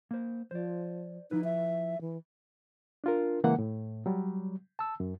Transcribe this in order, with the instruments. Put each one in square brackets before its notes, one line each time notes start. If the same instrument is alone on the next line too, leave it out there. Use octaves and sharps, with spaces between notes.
[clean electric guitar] A#3 C5
[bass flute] F3 [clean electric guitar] C5 D5
[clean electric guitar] F3 E4 B4 [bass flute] D#4
[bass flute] E5
E3
[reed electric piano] D4 F4 A#4
C#3 E3 G#3 A#3 F#5
A2
F#3 G3
A5 E6
F#2